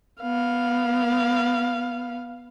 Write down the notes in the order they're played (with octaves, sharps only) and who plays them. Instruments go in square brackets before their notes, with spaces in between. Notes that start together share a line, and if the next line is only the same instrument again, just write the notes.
[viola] B3 F5